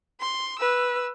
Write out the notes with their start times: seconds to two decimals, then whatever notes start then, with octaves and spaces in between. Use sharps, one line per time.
0.21 C6
0.59 B4 E6